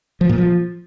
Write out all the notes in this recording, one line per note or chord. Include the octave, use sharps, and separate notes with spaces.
F3
A#2
F3